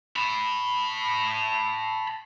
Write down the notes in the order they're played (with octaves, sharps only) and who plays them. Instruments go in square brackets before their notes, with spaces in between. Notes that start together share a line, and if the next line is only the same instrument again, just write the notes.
[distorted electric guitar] A5 B5